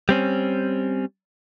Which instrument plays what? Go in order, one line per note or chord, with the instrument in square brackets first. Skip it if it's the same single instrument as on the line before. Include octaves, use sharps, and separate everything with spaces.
[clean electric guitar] G3 C4 C#4